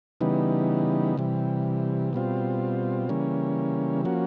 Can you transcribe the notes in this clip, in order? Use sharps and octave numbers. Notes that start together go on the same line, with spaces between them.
C#3 E3 G3 B3 D#4
C3 E3 G3
B2 G3 C4 F4
C#3 E3 G3 A#3 C#4
F3 A#3 C#4 F#4